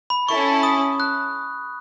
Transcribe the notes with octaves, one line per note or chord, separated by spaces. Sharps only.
B5
C#4 E4 A4 C#6
D#6
F#6